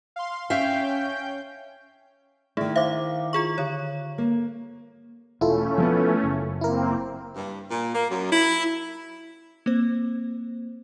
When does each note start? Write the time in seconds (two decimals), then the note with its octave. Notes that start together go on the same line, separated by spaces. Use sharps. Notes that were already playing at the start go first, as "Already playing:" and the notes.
0.16 F5 C6
0.50 C#4 E5 F5 G5 G6
2.57 D#3 A3 E4 G#4
2.76 C5 E5 F5 D6
3.33 F4 G#4 C#6
3.58 D3 C#5
4.18 A#3
5.41 E1 A3 C#4 E4 F4 A4
5.78 F3 G3 B3
6.23 F#1
6.61 A#3 C4 E4 A#4
7.35 G2
7.69 A#2
7.94 A#3
8.09 F#2
8.31 E4
9.66 A#3 C4 C5